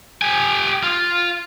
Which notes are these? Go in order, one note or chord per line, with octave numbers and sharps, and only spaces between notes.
G4 G#5
F4